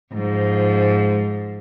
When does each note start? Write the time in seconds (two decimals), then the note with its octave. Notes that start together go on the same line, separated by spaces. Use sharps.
0.12 G#2 F3